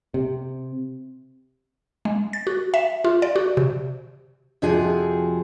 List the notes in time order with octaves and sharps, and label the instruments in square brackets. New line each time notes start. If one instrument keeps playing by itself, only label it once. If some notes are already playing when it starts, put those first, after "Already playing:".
[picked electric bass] C3
[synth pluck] G#3
A6
F#4
E5
F4
D5
F#4
C3
[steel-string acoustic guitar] F2 C3 F3 F#4 G#4 G#5